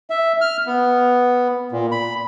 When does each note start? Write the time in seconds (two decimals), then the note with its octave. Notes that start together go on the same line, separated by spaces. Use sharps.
0.10 E5
0.41 F6
0.67 B3
1.72 A#2
1.92 B5